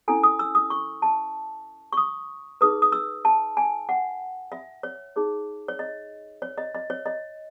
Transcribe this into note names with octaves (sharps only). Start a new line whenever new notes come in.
C#4 E4 A4 G#5
D#6
E6
D#6
C#6
A5
C#6
D#6
D#4 G#4 B4 D#6
D#6
E6
A5
G#5
F#5
E5
C#5
D#4 G#4 C#5
C#5
D#5
C#5
D#5
D#5
C#5
D#5